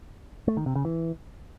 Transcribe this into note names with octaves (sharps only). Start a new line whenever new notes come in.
A3
D#3
C3
C#3
E3